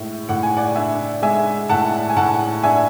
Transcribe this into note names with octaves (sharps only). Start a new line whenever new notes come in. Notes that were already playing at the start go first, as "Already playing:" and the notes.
Already playing: A2 G#3 E5
A2 F#5
G#5
D5 F#5
D4 E5 G#5
G#3 E5 G#5
A2 F#5 A5
G#5
A2 F#5 A5
D4 E5 G#5